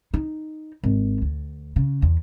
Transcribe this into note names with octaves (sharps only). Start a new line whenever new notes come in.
D#4
G#1
D2
C#3
E2